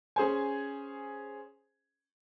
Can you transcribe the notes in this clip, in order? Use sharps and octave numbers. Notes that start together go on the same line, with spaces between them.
C#4 G#4 C5 G#5